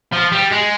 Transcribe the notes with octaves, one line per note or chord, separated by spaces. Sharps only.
F3
G3
G#3